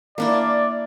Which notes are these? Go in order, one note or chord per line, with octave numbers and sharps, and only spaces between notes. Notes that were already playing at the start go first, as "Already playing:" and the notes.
A#3 D4 E4 D5